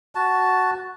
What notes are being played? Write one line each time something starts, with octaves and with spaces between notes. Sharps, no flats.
F#4 A5